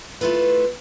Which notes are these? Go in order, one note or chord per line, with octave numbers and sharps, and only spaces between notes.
A3 E4 F4 A4 B4